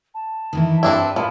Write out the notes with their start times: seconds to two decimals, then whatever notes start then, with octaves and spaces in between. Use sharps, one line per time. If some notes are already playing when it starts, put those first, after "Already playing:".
0.14 A5
0.53 D#3 E3 E4
0.83 G2 C4 D4 E4 B4
1.16 A#2 F3 B5